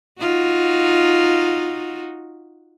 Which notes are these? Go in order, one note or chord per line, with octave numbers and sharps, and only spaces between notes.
D#4 F4 F#4